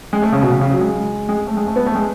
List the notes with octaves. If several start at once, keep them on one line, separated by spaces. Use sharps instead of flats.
G#3
A3
C#3
B2
C#3
C#3
F#3
G#3
G#3
A3
G#3
A3
B3
A3
G#3